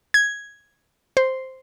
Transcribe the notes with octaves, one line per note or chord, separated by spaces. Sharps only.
G#6
C5